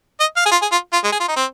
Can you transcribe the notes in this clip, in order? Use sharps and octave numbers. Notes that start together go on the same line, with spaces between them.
D#5
F5
G#4
F4
G#4
F4
F4
G#3
G#4
F4
D#4
C4